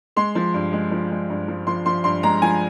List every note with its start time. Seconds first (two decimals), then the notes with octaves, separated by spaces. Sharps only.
0.16 G#3 C6
0.35 F3
0.54 G2
0.73 G#3
0.91 F3
1.10 G#3
1.30 G2
1.48 F3
1.67 F3 C6
1.86 F3 C6
2.04 G2 C6
2.23 G#3 A#5
2.42 F3 G#5